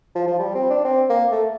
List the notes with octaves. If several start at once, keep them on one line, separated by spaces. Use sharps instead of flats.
F3
F3
G3
C4
D4
C4
A#3
A3